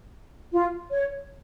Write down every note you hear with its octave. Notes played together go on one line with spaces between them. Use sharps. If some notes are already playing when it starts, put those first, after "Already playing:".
F4
C#5